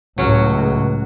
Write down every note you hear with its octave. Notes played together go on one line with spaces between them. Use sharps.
C#2 A2 F#3 C#4 F#4